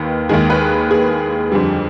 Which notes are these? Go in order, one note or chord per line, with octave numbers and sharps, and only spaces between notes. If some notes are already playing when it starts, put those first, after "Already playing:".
Already playing: D#2 D#3 B4
D#2 D#3 G#3 G#4
B4
G#4
F2 D3 G3